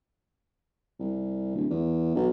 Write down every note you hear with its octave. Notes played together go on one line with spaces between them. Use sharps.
C2
D1
E2
B1